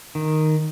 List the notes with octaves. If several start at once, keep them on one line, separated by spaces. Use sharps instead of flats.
D#3